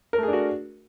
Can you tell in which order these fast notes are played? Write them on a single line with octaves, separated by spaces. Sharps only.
A#4 A3 G#4 D4 F#4